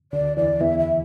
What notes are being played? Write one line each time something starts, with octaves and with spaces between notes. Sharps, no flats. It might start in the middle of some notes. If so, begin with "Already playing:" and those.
D2 D3 D5
E2 E3 D5
E2 E3 E5
E5